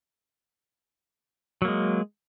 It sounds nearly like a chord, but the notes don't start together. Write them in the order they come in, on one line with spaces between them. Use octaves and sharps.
F#3 A#3 G#3